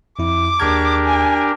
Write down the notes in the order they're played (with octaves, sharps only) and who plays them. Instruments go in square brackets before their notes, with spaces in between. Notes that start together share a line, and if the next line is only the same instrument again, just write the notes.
[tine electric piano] F2 E4 [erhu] D6
[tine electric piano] D#2 G#4 G#6 [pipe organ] D4 G4 A#4
[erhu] G#5